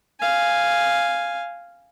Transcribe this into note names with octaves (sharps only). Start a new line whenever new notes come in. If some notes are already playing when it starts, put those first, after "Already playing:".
F5 G#5